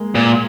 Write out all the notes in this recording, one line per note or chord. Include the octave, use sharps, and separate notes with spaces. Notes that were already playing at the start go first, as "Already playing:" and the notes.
Already playing: G#3 A#3
A#2